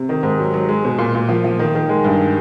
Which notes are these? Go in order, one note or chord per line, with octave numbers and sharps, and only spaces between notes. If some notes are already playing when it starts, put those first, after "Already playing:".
Already playing: C3
D#3
G#2
F#3
F#3
G#3
B2
A#2
A#2
F3
F3
D#3
D#3
G#3
G2